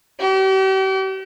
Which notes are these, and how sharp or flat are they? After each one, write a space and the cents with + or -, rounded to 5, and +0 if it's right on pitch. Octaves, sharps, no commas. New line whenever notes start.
G4 -40